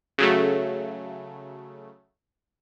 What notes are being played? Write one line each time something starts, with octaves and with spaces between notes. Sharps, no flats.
C#3 F#3 A3